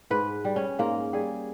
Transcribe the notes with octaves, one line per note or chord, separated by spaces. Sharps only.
G#2 B4
G3
C#4
G#2 A#3
G3 G#4